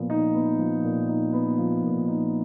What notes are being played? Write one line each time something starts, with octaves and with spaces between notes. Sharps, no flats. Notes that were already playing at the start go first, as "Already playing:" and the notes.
Already playing: A#2 F3 B3
D#4
B3
F3
A#2
D#4
B3
F3
A#2
D#4